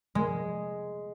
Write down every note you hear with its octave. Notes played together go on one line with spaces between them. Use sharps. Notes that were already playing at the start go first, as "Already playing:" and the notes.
G#3